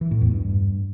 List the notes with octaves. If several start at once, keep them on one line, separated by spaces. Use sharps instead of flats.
E3
A2
E2
G2